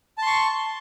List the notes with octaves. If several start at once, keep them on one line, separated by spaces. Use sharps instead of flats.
A5 C6 C#6